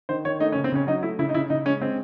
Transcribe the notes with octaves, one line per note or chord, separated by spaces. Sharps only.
D#3 C5
D#3 C#5
A3 D#4
C#4
C#3
C4
C#3 C#4
F#3 D#4
A3 E4
C#3 E4
D#4
C#3 E4
C#3 D#4
G#3 C#4
G#3 C4